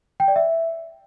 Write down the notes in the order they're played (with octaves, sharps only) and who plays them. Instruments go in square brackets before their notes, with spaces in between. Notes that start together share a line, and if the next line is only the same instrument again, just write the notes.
[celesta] G5
D5
E5